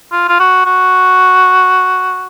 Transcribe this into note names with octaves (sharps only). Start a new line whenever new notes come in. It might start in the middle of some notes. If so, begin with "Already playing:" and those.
F4
F4
F#4
F#4